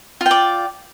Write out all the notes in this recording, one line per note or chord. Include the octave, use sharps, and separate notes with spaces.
F4 D5 G5